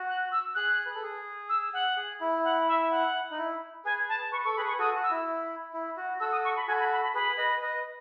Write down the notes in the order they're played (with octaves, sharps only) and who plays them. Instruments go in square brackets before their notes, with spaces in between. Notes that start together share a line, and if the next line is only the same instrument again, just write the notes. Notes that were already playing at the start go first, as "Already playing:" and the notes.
Already playing: [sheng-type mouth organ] F#4
[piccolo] F#6
E6
[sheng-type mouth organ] G#4 [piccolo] F#6
[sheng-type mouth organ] B4
A4
G#4
[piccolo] E6
F#5
[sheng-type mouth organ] G#4
E4
[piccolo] F#5
E5
F#5
[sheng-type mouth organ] D#4
E4
[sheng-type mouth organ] G#4 B4 [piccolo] G#5
[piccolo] A5
[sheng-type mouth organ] B4 [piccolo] C#6
[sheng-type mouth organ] A4 [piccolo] C#6
[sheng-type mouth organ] G#4 B4 [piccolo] B5
[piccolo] C#6
[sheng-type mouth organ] F#4 A4 [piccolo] D#6
[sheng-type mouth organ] F#4
[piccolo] E6
[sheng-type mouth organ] E4
E4
F#4
[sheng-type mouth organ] F#4 A4 [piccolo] E6
[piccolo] D#6
C#6
B5
[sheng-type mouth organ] F#4 A4 [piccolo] G#5
[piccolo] B5
B5
B5
[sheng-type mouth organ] G#4 B4 [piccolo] B5
[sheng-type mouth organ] B4 D#5
B4 D#5